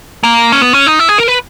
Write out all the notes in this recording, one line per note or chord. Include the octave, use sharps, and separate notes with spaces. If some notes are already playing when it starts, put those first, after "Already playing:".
A#3
C#4
B3
C#4
D#4
E4
G#4
A#4
B4